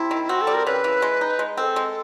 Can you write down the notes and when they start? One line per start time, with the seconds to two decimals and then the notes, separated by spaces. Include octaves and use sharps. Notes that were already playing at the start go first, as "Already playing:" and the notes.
Already playing: C3 E4
0.11 D#3
0.29 C4 F#4
0.41 A4
0.47 G3
0.54 A#4
0.66 C#3 B4
0.84 E3
1.02 G#3
1.21 D#4
1.39 G#3
1.57 C4 A#4
1.61 A4
1.76 G#3